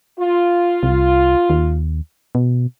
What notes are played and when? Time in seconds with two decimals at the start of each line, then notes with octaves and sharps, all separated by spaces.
0.19 F4
0.83 C2
1.50 D#2
2.35 B2